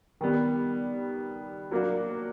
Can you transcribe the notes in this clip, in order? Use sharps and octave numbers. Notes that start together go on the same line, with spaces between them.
D#3 G3 B3
F#3 A#3 D4 F#4